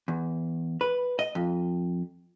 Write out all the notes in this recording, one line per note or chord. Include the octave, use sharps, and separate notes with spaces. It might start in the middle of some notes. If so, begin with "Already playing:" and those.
E2
B4
D#5
F2